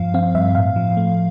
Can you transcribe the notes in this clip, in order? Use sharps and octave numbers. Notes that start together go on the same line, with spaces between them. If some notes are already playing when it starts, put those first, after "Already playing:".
Already playing: G2 F3 F5
C4 F5
G2 E5
A2 F5
F3
A3